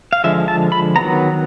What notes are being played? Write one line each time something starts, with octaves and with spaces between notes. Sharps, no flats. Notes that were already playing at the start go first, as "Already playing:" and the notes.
F5
D3 F3 G#3 E5
A5
B5
D#3 F#3 B3 A#5